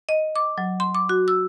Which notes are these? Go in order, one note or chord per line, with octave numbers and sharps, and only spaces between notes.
D#5
D6
F#3
C6
D6
F#4
E6